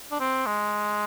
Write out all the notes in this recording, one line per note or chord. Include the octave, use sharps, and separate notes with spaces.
D4
C4
G#3